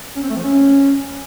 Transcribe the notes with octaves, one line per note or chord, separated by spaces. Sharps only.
C#4
C4
A3
F3
C#4